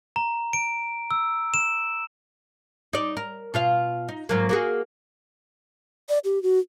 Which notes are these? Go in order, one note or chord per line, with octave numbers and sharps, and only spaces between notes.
A#5
D7
E6
E7
D#4 D5
A#4
B2 F4 F5
D#4
G#2 F#3 A#3
A#3 F#4 G#4
D5
G4
F#4